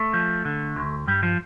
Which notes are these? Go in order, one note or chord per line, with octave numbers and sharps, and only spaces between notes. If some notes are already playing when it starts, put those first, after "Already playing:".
Already playing: A3
F3
D3
D2
G2 G3
F3